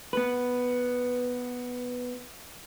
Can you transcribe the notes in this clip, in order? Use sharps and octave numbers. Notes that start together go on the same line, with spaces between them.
B3 B4